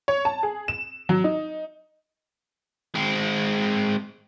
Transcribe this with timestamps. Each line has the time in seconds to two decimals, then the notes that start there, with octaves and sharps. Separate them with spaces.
0.08 C#5
0.25 A5
0.43 G#4
0.68 E7
1.09 F#3
1.24 D#4
2.95 G#3 C4